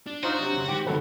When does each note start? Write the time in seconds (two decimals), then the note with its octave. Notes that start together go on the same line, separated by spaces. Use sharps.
0.07 D4
0.23 D#4 F4 F#4 C5 E7
0.39 C3 F#3
0.54 F#2 C#3
0.68 G#2 D#3 G4 G5
0.87 F#2 D3 D#3 F#3 G#3 A4 B4